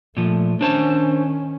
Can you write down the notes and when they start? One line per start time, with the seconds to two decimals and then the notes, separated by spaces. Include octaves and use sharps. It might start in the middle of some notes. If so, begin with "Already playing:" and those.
0.17 A#2 F3 A3
0.61 D#3 C#4 D4 C5 A5